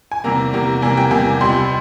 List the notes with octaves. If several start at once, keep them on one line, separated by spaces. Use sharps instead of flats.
G#5
E2 C3 G3 A#3 A#5
E2 C3 G3 A#3
E2 C3 G3 A#3 G#5
G5
E2 C3 G3 A#3 G#5
C#2 C3 G3 C6